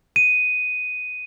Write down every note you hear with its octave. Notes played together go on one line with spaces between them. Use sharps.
D#7